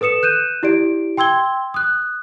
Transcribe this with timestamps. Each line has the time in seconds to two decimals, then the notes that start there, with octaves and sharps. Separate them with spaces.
0.01 A4 B4 D#6 C#7 E7
0.23 F#6 G6 D#7 E7
0.63 E4 G4 D5 D7
1.17 G5 C6 E6 G#6 G7
1.74 D#6 F#6